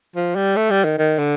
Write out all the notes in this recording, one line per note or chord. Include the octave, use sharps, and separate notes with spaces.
F3
G3
A3
G3
D#3
D#3
D3